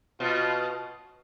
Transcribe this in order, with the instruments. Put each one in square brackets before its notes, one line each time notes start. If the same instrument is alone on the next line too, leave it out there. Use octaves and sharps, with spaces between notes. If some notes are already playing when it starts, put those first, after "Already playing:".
[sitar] B2 [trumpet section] F4